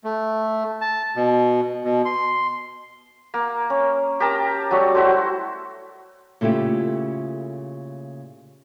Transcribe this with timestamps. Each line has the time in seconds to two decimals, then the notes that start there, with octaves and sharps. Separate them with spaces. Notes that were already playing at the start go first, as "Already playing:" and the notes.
0.04 A3
0.81 A5
1.16 B2
1.85 B2
2.05 C6
3.34 A#3
3.70 C#4
4.20 G4 A#4 A5 A#5
4.71 F#3 G3 A3 F#4
4.95 E4 F#4 A4 C5
6.41 A#2 C#3 A3 E4 G4